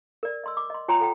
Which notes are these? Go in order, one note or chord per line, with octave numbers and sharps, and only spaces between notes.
A#4 D5
D#5 C6 E6
D6
D#5 C6
F4 C#5 G5 G#5 A#5 C6
A4 F#5 G5